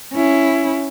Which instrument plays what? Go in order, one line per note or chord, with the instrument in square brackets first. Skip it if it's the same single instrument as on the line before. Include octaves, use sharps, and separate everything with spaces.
[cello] C#4 E4